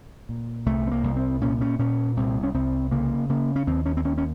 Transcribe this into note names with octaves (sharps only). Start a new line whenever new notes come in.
A#2
C2 A3
C4
A#3
C2
C4
A#2 C#4
C#4
A#2 C#4
C2 C4
C#4
C2 C4
C#3 A#3
C#3 A#3
C#4
D#2 C4
C#4
C4
D#2 C#4
C#4